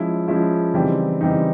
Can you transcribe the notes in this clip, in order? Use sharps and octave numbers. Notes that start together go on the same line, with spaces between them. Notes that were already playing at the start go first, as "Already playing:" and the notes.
Already playing: F3 G#3 C#4 E4
F3 G#3 C#4 E4
C#3 E3 G3 C4 D#4
C#3 E3 G3 C4 D#4